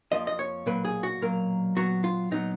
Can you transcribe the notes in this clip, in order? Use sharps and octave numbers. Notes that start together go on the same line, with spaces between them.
F2 F3 A#3 D#5
D#5
C#5
B1 A#2 F#3 A#3 B4
G#4
F#4
B1 A#2 F#3 A#3 A#4
A#2 F#3 B3 F#4
F4
A#2 F#3 B3 D#4